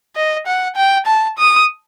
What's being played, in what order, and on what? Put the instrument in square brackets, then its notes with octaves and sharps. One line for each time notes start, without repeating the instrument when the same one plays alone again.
[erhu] D#5
F#5
G5
A5
D#6